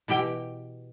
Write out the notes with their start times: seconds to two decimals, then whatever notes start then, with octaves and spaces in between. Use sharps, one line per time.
0.08 B2 E3 G4 G5